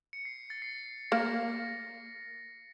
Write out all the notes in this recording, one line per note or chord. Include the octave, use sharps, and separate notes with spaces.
C#7
C7
A6
C7
A#3 A#6